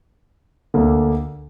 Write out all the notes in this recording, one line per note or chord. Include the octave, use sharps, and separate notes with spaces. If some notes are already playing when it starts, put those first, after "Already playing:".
D2 D3 A#3 D4